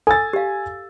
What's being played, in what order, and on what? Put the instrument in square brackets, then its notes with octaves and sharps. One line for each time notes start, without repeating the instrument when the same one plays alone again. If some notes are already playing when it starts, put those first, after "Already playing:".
[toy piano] A4 [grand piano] G#5 E6 A6
[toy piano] G4 F5